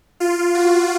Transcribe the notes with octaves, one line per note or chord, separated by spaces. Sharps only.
F4
F#4